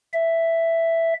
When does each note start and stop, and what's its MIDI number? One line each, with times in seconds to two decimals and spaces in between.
0.14 1.14 76